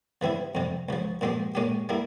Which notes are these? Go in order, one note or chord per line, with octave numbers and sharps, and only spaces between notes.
C#3 E3 G3 C4 E4
F2 C3 G3
C#2 C#3 F3
A#2 F3 G#3 C4 G4
A#2 G#3 C#4 G4
G3 A#3 E4